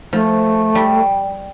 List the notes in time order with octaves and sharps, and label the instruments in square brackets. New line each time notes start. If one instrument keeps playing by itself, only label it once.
[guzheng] F3 [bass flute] A3
[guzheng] G3